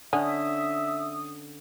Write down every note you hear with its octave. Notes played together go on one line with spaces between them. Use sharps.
D3 C#4 E5 F#5 G#5 D#6